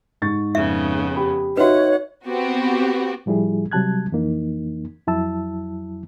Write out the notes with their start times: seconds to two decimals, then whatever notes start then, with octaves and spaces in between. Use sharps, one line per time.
0.22 G#2 C#6 A6
0.55 F2 C#3 B3 E5
1.16 G4 B5
1.57 D#4 F#4 B4 C#5 E5 F#5
2.25 B3 C4 F#4 G4
3.26 A2 F3 G3 E4 G#4
3.72 C3 F#3 G3 A5 F#6 G#6
4.12 F2 E3 A#3 D#4
5.07 F2 F#3 E4 A5 E6